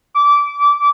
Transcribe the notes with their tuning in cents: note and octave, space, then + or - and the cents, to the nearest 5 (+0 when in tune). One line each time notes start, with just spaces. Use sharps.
D6 -20